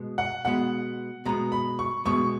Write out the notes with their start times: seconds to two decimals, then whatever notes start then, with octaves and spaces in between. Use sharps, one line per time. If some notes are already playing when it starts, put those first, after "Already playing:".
Already playing: B2 G#3 B3
0.18 F#5
0.45 B2 G#3 B3 F#5
1.25 B2 G#3 B3 A#5
1.52 B5
1.79 C#6
2.05 B2 G#3 B3 C#6